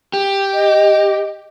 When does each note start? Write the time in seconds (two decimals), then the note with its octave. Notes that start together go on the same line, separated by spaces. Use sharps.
0.13 G4
0.54 D#5